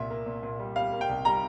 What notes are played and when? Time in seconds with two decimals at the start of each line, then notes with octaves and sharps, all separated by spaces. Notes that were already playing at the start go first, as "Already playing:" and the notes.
Already playing: C2 A#2 E5
0.10 A#3
0.26 A#2
0.43 A#2
0.60 G3
0.76 G3 F5
0.93 A#3
1.01 G5
1.09 C2
1.25 G3 A#5